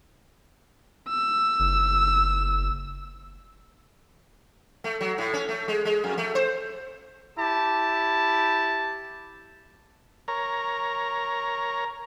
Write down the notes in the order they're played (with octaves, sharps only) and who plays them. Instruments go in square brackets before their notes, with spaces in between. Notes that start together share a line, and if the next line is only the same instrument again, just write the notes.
[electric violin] E6
[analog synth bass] F#1
[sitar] A3
F#3
A2
C#4
A3
G#3
G#3
F2
A3
C5
[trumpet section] E4 G4 A5
[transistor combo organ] A#4 C#5 A#5